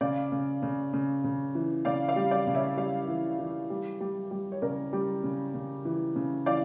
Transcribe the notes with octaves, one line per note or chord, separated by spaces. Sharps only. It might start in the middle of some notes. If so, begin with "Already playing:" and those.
C#3 D5 F5
C#3
C#3
C#3
C#3
E3
C#3 D5 F5
D5 F5
G3
D5 F5
C#3
C#5 E5
G3 D5 F5
E3
E3
G3
G3
G3
C#5
C#3 A#4 D5
G3
C#3
C#3
E3
C#3
E3 D5 F5